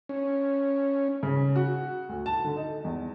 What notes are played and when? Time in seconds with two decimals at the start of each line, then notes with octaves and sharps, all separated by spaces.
0.09 C#4
1.23 C#3
1.56 F#4
2.09 D2
2.26 A5
2.44 D3
2.57 D#4
2.84 E2